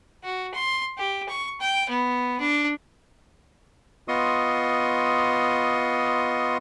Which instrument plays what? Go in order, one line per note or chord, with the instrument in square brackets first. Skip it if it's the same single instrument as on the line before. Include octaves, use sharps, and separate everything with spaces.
[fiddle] F#4
C6
G4
C#6
G5
B3
D4
[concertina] B3 F4 D#5 C6 C#6 D#6